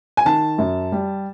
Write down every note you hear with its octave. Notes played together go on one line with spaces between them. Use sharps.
G#5
D#3 A5
F#2
G3